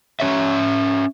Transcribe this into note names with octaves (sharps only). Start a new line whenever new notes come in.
C#4 C#5 E5